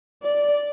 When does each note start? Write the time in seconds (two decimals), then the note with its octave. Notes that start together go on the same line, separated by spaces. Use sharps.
0.23 D5